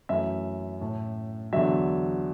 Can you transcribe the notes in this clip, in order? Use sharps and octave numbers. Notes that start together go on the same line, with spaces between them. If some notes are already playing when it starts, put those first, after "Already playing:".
F#2 E3 A3 E5
A2 A3
E2 D3 F#3 E5